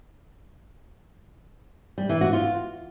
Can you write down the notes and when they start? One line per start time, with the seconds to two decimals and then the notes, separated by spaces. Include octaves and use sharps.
1.98 G3
2.09 E3
2.21 F#4
2.33 F4